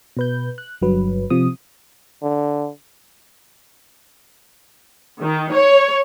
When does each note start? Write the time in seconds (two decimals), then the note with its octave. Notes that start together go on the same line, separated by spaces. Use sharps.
0.17 B2 B4 G6
0.58 F#6
0.82 G1 G2 F#3 B4
1.30 C3 F3 D#6
2.22 D3
5.20 D#3
5.51 C#5